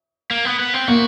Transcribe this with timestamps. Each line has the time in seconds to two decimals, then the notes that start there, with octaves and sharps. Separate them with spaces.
0.31 A#3
0.45 B3
0.59 B3
0.74 C4
0.88 A#3 F#4